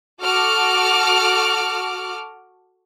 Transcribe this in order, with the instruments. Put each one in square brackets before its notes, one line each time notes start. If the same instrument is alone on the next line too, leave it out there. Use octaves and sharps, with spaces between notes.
[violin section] F#4 A4 D6 F6